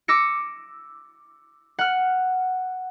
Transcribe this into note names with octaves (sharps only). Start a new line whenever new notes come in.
D6 E6 A#6 C#7
F#5 F6